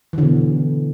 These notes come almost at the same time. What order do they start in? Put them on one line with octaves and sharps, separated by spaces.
E3 D3 B2